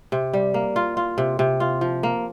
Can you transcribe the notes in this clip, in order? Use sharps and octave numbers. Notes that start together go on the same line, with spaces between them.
C3
G3
A#3
F4
F4
C3
C3
F4
F3
A#3